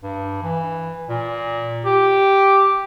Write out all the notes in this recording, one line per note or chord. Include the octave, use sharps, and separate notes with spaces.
G2
E3
A#2
G4